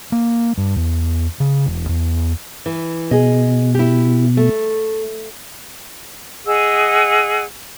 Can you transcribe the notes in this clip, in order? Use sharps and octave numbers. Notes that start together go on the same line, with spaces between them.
A#3
G2
E2
C#3
E1
E2
E3
B2 G#4 D#5
E4 G4
A3
G#4 D#5 F#5 E6